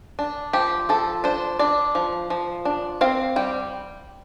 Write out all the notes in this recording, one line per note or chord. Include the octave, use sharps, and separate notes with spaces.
D4
F3 G4
F3 A4
D4 C5
D4 D5
F3
F3
D4
C4 F5
G3 G5